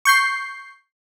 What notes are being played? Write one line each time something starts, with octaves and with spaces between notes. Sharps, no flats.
C#6 G6 C7